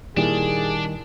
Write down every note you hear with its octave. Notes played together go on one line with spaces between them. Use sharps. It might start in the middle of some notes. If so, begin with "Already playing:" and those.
A#2 D#3 G3 D4 E4 G#4